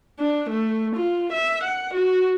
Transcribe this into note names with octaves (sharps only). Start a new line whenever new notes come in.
D4
A3
F4
E5
F#5
F#4